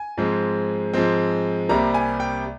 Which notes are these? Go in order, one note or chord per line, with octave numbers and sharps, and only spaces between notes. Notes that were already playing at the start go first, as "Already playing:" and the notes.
Already playing: G#5
G#2 F3 G#3 C4
G#2 F3 G#3 C4
C2 C3 G3 A#3 A#5
G#5
G5